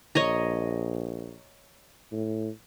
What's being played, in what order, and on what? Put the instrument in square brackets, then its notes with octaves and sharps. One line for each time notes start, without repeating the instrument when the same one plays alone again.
[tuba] A#1 [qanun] C#5 D#5 A#5
[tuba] A2